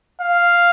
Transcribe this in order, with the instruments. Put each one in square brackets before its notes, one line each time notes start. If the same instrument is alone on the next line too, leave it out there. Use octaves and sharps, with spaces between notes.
[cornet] F5